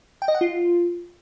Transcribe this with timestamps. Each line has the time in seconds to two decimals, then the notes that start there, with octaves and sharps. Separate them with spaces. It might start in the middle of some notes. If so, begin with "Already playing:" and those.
0.22 G5
0.28 D#5
0.35 F#5
0.41 F4